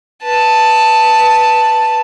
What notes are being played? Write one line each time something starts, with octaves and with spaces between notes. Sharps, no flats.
B4 A5